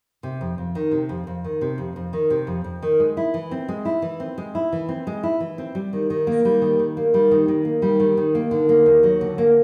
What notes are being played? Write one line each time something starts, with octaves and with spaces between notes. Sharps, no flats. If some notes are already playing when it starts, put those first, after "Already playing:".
C3
F2
F2
D#3
C3
F2
F2
D#3
C3
F2
F2
D#3
C3
F2
F2
D#3
G#3
E4
E3
C4
G#3
E4
E3
C4
G#3
E4
E3
C4
G#3
E4
E3
C4
G3
D#3
D#3
A#3
G3
D#3
D#3
A#3
G3
D#3
D#3
A#3
G3
D#3
D#3
A#3
D3
A#3
D#2
F#3
D3
A#3